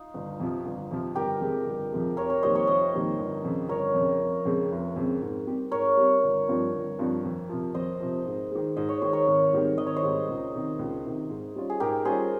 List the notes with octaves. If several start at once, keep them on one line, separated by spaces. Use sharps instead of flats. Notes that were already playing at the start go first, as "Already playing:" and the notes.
Already playing: D#4 F4
G1
F2 C3 F3
G1
F2 C3 F3
G1 G4 A#4
F2 C3 F3 G#3
G1
F2 C3 F3 G#3
F1 A#4 C#5
A#4 C#5
F2 D#3 G3 A#3 C5 D#5
A#4 C#5
F1 C5 D#5
F2 D#3 G3 A#3
G1
F2 C#3
G1 A#4 C#5
F2 C#3
F1
F2 C#3 G#3 C4
F1
F2 C#3 G#3 C4
G#2
G3 C4 G4
G#2 A#4 C#5
G3 C4 G4
G1
G2 F3 C4 F4
G1
G2 F3 C4 F4
F2
C3 F3
F2 C5 D#5
C3 F3
G#2
D#3 G#3
G#2 D#5
C#5
D#3 G#3 C5
A#4 C#5
G#1
G#2 D#3 G3 C4
G#1 D#5
C#5
C5 D#5
G#2 D#3 G3 C4
C#2
C3 D#3
C#2
C3 D#3
G#2
G3 C#4 F4
G#4
G#2 G4 A#4
G3 C#4 F4 G#4 C5